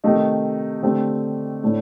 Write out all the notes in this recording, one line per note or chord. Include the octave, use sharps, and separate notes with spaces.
C3 D#3 A3 D#4
D3 A3 C4 G4
A2 A3 D4